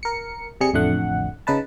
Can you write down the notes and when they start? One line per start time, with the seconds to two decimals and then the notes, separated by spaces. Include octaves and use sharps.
0.03 A#4 C#7
0.61 C3 G3 G#4 C#7
0.73 A1 F2 D3 A3 F#5
1.47 C#3 D#4 B4 A5